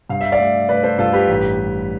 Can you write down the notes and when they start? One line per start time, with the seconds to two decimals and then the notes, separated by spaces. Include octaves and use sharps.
0.09 G2 F5
0.21 E5
0.32 D5 F5
0.39 A3
0.69 A3 B4 D5
0.83 A4 C5
0.98 G2 F4 A4
1.13 G4 B4
1.28 A1
1.58 G3